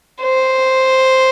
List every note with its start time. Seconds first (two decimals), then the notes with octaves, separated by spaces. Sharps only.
0.22 C5